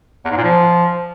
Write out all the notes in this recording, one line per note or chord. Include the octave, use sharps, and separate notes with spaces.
E2
G#2
A#2
F3